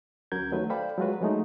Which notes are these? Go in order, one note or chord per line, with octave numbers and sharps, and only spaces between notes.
D2 F#3 C#4 A#4 G6 G#6
D#3 F#3 A3 B4
A4 C5 D5 F5 G5 B5
F#3 G#3 F4 F#4 B4
F3 F#3 G#3 A3 D#4